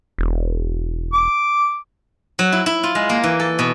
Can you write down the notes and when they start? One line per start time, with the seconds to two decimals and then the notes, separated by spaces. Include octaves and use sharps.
0.18 E1
1.13 D6
2.39 F#3
2.52 E4
2.66 E4
2.83 F4
2.95 G#3
3.09 A#3
3.24 E3
3.40 A4
3.59 B2